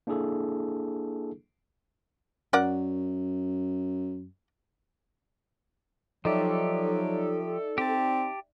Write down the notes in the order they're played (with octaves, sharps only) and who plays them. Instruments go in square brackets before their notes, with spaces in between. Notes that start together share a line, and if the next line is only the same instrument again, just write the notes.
[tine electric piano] A#3 D4 E4 G#4 A4
[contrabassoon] F#2 [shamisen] A#4 D5 F#5
[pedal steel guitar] F3 G4 [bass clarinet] F#3 [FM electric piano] D#4 D5 E5 [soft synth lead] A4
[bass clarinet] C4 [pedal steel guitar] G4 A5